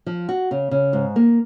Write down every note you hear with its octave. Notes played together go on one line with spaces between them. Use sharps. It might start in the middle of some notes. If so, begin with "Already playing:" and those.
F3
F#4
C#3
C#3
G#2
A#3